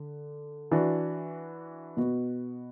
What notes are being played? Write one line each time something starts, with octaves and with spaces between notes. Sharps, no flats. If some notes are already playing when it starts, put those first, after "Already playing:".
Already playing: D3
E3 D4 F#4
B2 B3 F#4